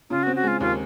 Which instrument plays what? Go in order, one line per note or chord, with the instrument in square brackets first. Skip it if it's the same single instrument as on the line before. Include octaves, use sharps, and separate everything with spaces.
[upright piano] C#3 [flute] F4
[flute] F#4
[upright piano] C4
[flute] F#4
[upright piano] G#3 [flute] F4
[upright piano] D#2 [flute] F4